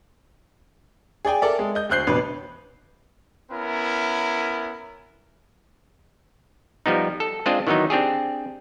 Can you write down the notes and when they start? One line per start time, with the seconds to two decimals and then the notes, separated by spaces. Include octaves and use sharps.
1.25 G#4 D5 G5 G#5
1.42 A4 A#4 D5 E5
1.59 G#3
1.75 D#5 G6
1.89 D2 C5 F#6 G6 C7
2.07 A1 B2 D4 B4
3.52 B3 C#4 E4 A#4
6.86 F3 G3 B3 D#4
7.20 A4
7.46 G#3 C4 D4 F4 C5 D#5
7.67 D#3 E3 F#3 B3 D#4
7.90 C4 D4 G4 G#4